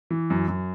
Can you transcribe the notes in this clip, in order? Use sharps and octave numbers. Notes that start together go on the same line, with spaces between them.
E3
F#2
F#2